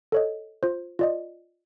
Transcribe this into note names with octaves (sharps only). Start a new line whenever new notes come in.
A4 C#5 D#5
F4 C5
F4 D5 D#5